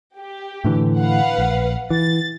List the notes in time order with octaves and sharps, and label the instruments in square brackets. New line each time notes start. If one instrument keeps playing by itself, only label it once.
[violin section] G4
[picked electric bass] A2 D3 E3
[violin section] B4 F5 F#5
[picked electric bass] A#1
[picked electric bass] E3 [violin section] A6